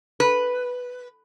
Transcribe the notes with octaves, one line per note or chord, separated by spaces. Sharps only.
B4